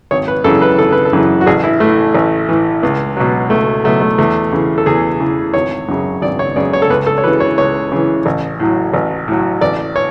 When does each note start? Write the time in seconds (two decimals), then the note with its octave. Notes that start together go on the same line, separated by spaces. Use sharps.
0.11 G#1 C#5
0.28 B4
0.44 F#2 C#3 E3 A4
0.62 B4
0.78 G#1 A4
0.92 B4
1.05 A4
1.13 F#2 C#3 E3
1.41 F#4
1.47 A1 G#4
1.64 E4
1.80 A2 E3 A3
2.15 A1
2.49 A2 E3
2.83 C#2
3.17 B2 F#3
3.50 C#2 A3
3.84 B2 F#3 A3
4.01 A3
4.18 E2 A3
4.52 C#3 E3
4.78 A4
4.86 E2 G#4
5.20 C#3 E3
5.54 G#1 C#5
5.88 F#2 C#3
6.22 G#1 D5
6.39 C#5
6.56 F#2 C#3 D5
6.73 C#5
6.82 A4
6.90 C#2 B4
7.07 A4
7.18 C#5
7.24 C#3 E3 B4
7.40 C#5
7.58 C#2 C#5
7.92 C#3 E3
8.26 A1
8.60 A2 F#3
8.94 A1
9.28 A2 F#3
9.61 A1 D5
9.96 C#5